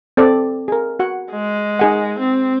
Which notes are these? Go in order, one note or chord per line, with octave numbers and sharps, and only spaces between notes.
C4 A4 D5
G#4 A#4
F#4 F#5
G#3
D#4 G#4 F#5
C4